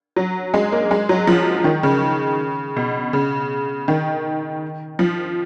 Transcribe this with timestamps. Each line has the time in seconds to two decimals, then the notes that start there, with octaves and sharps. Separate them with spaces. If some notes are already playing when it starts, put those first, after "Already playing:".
0.16 F#3
0.54 G#3
0.72 A#3
0.91 G#3
1.09 F#3
1.27 F3
1.64 D#3
1.83 C#3
2.77 B2
3.13 C#3
3.88 D#3
4.99 F3